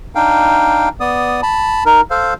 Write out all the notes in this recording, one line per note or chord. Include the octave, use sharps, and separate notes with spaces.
D4 D#4 F5 G5
B3 D5 D#6
A5 B5
D#4 A#4
A4 C5 F5